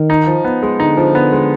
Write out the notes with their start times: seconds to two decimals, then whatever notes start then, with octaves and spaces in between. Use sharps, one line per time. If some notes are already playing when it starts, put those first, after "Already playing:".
Already playing: D#3
0.10 D#4
0.27 F3
0.45 B3
0.63 G#3
0.80 D3 D#4
0.97 F3
1.15 B3
1.32 G#3